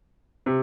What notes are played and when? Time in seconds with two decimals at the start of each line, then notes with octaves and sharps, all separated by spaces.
0.46 C3